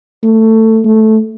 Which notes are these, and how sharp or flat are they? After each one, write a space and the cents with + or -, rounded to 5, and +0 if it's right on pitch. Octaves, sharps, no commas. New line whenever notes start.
A3 +15
A3 -5